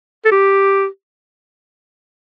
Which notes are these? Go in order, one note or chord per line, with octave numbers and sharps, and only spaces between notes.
A4
G4